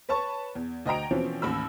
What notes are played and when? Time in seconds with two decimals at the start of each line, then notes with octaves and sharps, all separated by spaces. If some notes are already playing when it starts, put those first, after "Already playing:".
0.09 B4 C#5 A5 C#6
0.55 E2
0.86 D2 D#5 G5 A#5 D7
1.11 B2 E3 F3 C4 C#4
1.42 A1 D#2 B5 E6